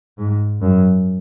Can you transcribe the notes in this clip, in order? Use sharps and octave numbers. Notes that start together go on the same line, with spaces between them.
G#2
F#2